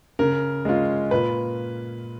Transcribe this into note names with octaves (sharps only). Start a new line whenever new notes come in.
C#3 A#4
G#3 C#4 F4
A#2 B4